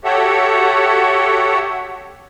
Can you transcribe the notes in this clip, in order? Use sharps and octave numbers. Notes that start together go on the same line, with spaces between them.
F#4 G4 A4 C#5 E5 F#5